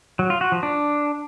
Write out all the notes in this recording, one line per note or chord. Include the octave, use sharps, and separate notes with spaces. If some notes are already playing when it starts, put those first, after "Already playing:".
F#3
F4
F#4
F3
D4